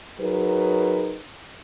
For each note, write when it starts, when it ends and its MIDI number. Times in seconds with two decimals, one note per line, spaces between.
0.19 1.18 54
0.19 1.18 63
0.19 1.18 68
0.19 1.18 70
0.19 1.18 71